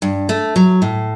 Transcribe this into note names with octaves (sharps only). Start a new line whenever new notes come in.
G2
A3
F#3
A2